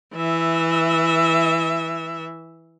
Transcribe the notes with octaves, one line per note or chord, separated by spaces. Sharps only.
E3 E5